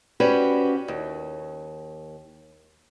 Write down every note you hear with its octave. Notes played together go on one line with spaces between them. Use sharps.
C#4 F#4 G4 B4 C5 D5
D#2